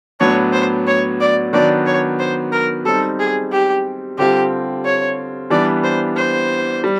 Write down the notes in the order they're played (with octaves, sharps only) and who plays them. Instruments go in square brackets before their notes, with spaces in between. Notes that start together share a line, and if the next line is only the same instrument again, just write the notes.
[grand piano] A2 F#3 B3 D4 [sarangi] C#5
[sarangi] C5
C#5
D5
[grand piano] D#3 F#3 B3 D4 F#4 [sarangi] D5
[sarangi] C#5
C5
A#4
[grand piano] G3 C4 D#4 [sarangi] A4
[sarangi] G#4
G4
[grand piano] D3 G3 C4 F4 [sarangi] G4
[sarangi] C#5
[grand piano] E3 G3 B3 D4 [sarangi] D5
[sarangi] C5
C5
[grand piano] G3